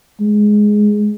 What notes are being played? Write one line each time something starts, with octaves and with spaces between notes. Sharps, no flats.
G#3